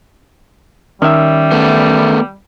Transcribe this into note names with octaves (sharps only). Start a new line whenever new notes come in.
D#3 G3 C#4 E5
A3 B3